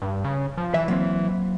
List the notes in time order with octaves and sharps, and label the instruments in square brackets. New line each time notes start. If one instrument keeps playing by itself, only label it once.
[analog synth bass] G2
C#3
F3
[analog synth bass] E3 [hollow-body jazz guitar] E5
[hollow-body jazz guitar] F#3 A#3 C4